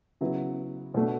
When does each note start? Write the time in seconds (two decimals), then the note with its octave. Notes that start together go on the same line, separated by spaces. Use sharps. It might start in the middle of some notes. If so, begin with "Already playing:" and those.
0.21 C#3 F#3 B3 E4
0.94 B2 A3 D4